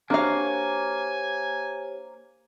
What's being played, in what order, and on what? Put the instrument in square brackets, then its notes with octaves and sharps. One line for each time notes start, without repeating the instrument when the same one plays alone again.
[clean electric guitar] A#3 [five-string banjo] D4 F#4 F5 [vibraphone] G4 C5 C#5 [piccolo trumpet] G#5